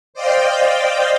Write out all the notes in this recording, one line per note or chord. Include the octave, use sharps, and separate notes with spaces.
C5 D5 D#5 F5 G5